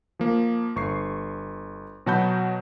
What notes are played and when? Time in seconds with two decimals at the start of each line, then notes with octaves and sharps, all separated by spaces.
0.19 F3 A#3
0.76 G1 C#6 C7
2.06 B2 F#3 F#4 A5 B5 G6